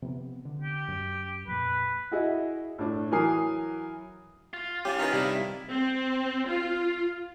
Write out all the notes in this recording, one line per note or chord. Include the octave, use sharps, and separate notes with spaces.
C3 F3 B3
D3
G4
F#2
F2 A#2 B4
E4 F#4 G#4 D#5 E5
A2 D4
E3 F#3 A#4 G#5 D#6 C7
F4
C#4 E4 G4
D#3 C#4 B4
C3 G3 D4 E4 F5
C4
F4